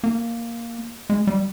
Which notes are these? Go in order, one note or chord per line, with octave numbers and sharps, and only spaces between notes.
A#3
G#3
G3